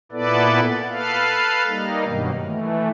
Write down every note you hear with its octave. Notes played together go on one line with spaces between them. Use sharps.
A#2 B3 E4 A4 B4 D5
A4 B4 F5
G3 A#3 D#4
G2 B2 D#3 F#3 G3
E3 A3